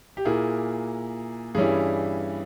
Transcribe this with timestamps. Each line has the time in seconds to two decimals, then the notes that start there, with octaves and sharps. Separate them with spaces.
0.17 G4
0.25 A#2 A#3 E4 G#4
1.55 G2 E3 G3 C#4 E4 G#4